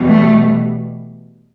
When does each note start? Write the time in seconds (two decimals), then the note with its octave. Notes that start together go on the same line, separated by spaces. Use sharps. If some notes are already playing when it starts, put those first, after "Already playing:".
Already playing: E2 B2 G3
0.08 A3